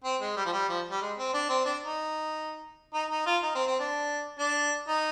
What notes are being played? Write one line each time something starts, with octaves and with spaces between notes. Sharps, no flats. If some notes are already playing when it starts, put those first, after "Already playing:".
C4
G#3
G3
F3
G3
F3
G3
G#3
C4
D4
C4
D4
D#4
D#4
D#4
F4
D#4
C4
C4
D4
D4
D#4